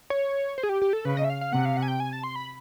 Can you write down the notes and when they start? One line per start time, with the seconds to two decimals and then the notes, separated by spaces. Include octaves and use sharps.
0.10 C#5
0.58 C5
0.63 G#4
0.69 G4
0.82 G4
0.93 A4
1.05 C#3 B4
1.17 D#5
1.24 E5
1.30 F5
1.41 F5
1.53 C3 F#5
1.65 F5
1.77 F#5
1.82 G#5
1.88 G5
2.00 G#5
2.13 A5
2.24 C6
2.36 B5